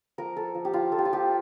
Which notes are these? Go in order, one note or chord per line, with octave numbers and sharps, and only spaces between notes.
F3 A#4
A4
F3
G4
F4
F3 A4
G4
F4
G4